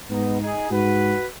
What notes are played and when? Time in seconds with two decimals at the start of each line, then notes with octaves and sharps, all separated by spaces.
0.10 G#2 B3 D#4
0.41 D#4 G#4
0.71 G#2 F#4 B4